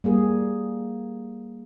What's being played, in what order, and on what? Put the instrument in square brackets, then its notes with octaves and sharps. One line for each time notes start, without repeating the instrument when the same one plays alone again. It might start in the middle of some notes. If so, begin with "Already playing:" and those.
[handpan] G3 A#3 G#4